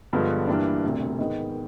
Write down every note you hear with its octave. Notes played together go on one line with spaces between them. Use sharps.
G2 D3 F3 G#3 B3
G2 E3 G3 A#3 D4
E1 D2 C3
G#2 D#3 G#3 B3